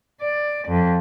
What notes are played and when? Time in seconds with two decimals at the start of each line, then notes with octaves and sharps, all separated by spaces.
0.20 D5
0.67 F2